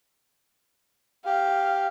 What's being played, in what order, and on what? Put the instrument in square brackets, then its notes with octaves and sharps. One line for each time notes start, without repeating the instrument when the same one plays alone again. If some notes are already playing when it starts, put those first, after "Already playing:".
[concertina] G4 [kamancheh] F5